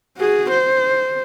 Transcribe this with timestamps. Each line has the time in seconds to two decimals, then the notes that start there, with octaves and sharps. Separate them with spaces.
0.18 F#4 G#4
0.51 C5